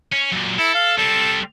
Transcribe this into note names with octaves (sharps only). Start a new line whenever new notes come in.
C#4
F#2 A#2
E4 A4
F5
G3 C4 A4